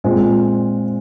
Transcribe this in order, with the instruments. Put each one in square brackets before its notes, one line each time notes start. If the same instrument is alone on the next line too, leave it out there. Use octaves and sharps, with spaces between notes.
[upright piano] A#2 G#3 C4 F4